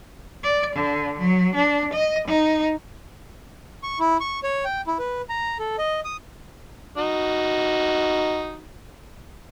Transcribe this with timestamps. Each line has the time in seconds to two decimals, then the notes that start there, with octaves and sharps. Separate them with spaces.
0.44 D5
0.76 D3
1.19 F#3
1.55 D4
1.93 D#5
2.28 D#4
3.83 C#6
4.00 E4
4.20 C#6
4.43 C#5
4.65 G5
4.87 E4
4.99 B4
5.29 A#5
5.59 A4
5.78 D#5
6.05 D#6
6.98 D#4 F#4